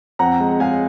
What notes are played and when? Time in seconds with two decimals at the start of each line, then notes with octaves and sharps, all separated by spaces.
0.19 F2 F#5 A#5
0.40 G#3
0.60 G#3 F5 G#5